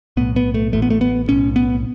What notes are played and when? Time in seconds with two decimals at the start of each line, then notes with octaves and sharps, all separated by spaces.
0.17 B1 A2 B3
0.36 B3
0.54 A3
0.73 A1 A2 A3
0.82 B3
0.90 A3
1.01 B3
1.28 B1 A2 C#4
1.56 B3